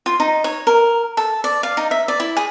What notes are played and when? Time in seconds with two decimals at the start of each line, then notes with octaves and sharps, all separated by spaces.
0.06 F4
0.20 D#4
0.44 C#5
0.67 A#4
1.17 A4
1.44 D5
1.63 F5
1.77 D#4
1.91 E5
2.08 D5
2.20 E4
2.37 G#4